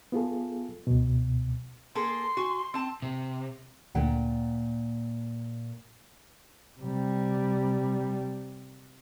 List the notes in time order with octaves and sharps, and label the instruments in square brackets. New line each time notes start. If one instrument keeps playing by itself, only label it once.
[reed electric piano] B3 F4 G#4 A4
C#2 B2
[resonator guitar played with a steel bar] A#3 G#4 A4 [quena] C6
[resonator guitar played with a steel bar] F#4 G#5
C4 A5
[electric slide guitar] C3
[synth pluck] D2 D3 [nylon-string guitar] A#2 F#5 G5
[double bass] C3 G3